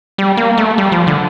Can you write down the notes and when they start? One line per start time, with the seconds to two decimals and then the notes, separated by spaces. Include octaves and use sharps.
0.18 G3
0.37 A#3
0.58 A3
0.78 G3
0.92 F3
1.07 D3